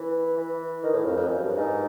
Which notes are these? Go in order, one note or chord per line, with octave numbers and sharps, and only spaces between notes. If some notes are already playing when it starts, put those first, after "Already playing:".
Already playing: E3
E3
D#3
A2
F2
F2
F#2
G2
G#2